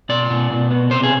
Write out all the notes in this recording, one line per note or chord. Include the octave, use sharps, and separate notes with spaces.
B2 D5
B2
B2
B3
C3 C5
G#4